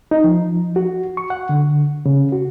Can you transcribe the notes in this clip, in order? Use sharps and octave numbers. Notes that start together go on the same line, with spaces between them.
D#4
F3
F#4
C#6
F#5
D3
C#3
F#4